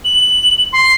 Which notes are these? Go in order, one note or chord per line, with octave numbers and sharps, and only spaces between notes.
F#7
C6